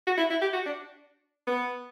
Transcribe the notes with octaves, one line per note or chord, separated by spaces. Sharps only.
F#4
E4
E4
G4
F#4
D4
B3